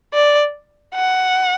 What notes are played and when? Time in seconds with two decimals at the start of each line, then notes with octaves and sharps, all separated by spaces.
0.14 D5
0.94 F#5